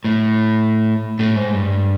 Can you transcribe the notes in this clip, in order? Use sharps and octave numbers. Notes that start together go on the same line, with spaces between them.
A2
A2
G#2
G2